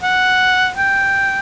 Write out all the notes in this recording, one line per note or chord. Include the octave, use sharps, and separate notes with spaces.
F#5
G5